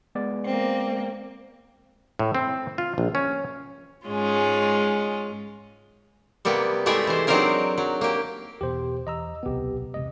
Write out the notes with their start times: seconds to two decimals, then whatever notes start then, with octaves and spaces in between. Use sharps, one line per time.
0.15 G#3 B3 D5
0.46 A#3 C4
2.19 A2
2.35 C4
2.78 F4
2.98 A#1
3.15 C#4
4.08 G#2 G#3 C#4 F4
6.45 C3 G3 A#3 B3
6.86 G#3 A3 E4 G4 G#4 E5
7.07 E3 C5
7.27 F#3 C4 D4 D#4 A#4 C5
7.78 F#3
8.01 A#3 G4
8.61 E2 B2 G4 C5
9.07 E2 D#5 A#5 E6
9.43 D1 B1 C3 B3 G4
9.94 E1 A2 C3 D#5